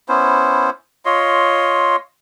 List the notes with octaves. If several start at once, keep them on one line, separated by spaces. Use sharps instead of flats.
B3 C#4 E4 C5
F4 C#5 D#5 C6